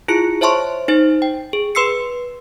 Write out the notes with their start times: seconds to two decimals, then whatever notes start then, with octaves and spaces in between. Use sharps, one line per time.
0.08 E4 F4 G#4 C#7
0.41 C5 C#5 E5 A5 C6 C#6
0.88 D#4 C5 A6
1.22 G5
1.53 G#4
1.75 B4 C6 E6 C7 C#7